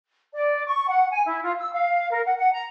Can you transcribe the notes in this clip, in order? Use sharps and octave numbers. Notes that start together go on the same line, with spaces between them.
D5
C#6
F#5
G#5
E4
F4
E6
F5
A#4
F#5
F#5
A#5